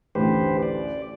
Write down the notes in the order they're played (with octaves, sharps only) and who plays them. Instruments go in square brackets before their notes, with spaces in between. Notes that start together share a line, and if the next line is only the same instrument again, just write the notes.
[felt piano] A1 D2 [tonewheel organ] G4 B4 C5
[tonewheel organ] D5